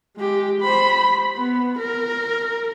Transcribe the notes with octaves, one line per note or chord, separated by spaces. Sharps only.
G#3 G4
C5 B5
B3
A#4